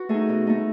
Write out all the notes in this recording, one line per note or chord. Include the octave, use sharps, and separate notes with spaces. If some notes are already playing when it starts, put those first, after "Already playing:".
Already playing: F#4 B4
A3 D#4 G#4
B2
A3 D#4